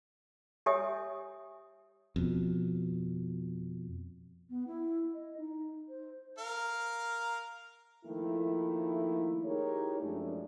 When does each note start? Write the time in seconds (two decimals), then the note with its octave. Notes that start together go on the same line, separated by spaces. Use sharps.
0.66 G4 C#5 E5 G#5 D#6
2.16 F2 B2
4.50 B3
4.67 E4
5.14 D#5
5.37 D#4
5.89 C5
6.38 A#4 F5
8.05 D#3 F3 A3 A#3 E4
9.45 D#4 E4 G4 G#4 A#4 C#5
10.00 F#2 F3 G#3 A3 C#4 D4